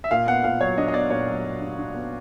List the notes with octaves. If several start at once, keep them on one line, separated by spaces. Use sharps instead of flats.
E5
A#2 F5
B3 F#5
A#2 F5
F#3 C#5
D4 D#5
D#5
B3 D5
A#2 C#5
F#3
F#3
D4
D4
B3